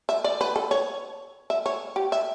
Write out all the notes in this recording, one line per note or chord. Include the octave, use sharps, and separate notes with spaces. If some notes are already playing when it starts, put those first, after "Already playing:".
E5
D5
B4
A4
C#5
E5
C#5
G4
E5